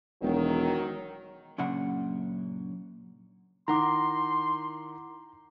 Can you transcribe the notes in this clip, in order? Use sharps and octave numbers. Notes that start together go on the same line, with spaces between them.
E1 D#3 F#3
F#2 A#2 C#3 D4 F#5 B5
D#3 E4 F#5 A#5 C6 D6